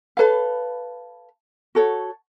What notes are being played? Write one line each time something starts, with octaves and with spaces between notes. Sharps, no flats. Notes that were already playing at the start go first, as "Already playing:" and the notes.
A4 B4 C#5 F5
F#4 A4 C#5